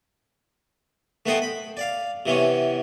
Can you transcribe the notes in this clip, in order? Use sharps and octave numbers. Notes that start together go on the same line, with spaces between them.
A3 B3 B4 C5 D#5 G5
B5
D5 F5
C3 E3 B3 C#4